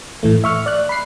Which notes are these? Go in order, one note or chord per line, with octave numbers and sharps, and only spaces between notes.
A2 E3 A3
E5 C#6 F6
D5 F#6
B5 C7